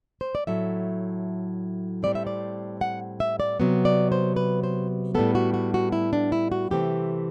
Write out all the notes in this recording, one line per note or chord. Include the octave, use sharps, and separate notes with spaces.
C5
D5
A2 F#3 A3 E5
A2 G3 C4 D5
E5
D5
F#5
E5
D5
C3 F#3 B3
D5
C5
B4
C5
A2 G3 B3 A4
F#4
F#4
F#4
E4
D4
E4
F#4
C3 E3 A3 C4 G4